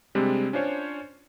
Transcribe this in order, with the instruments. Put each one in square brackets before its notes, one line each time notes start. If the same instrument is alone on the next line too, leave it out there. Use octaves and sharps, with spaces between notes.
[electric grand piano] C3 G3 G#3 C4 D4
C#4 D4 F4 C5 C#5